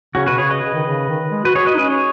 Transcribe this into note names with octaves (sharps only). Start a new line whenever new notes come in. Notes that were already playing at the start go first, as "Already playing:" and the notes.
C#3 C#4 F#4
B2 F#4 B4
C#3 G#4 C#5
B4 D#5
C#3
D#3
C#3
D#3
G#3
F#4 B4
F#4 G#4 C#5
B4 D#5
D#4
C#4 B4 D#5
G#4 C#5